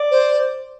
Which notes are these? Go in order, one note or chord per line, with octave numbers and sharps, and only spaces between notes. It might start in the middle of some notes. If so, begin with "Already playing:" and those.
Already playing: D5
C5